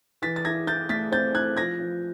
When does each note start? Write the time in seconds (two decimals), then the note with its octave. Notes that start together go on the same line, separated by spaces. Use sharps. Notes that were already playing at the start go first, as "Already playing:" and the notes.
0.22 E3 A6 B6
0.36 A6
0.45 E4 G#6 A#6
0.67 E4 G6 A6
0.89 A3 A6 B6
1.12 C4 G6 A6
1.34 E4 F#6 G#6
1.57 F3 G#6 A#6
1.80 F3